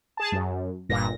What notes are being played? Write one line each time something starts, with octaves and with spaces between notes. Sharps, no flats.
G#4 A5
F#2
G1 A#2 A#6